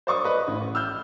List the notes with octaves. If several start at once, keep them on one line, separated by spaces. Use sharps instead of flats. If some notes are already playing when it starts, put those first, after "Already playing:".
C5 D5 C#6 D#6
B4 D#5
A1
E6 F6 G6